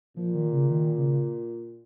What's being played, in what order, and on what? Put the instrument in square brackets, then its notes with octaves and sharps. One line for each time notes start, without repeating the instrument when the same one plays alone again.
[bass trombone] A#2 [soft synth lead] F3
[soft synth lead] D#3
C#3
D#3
C#3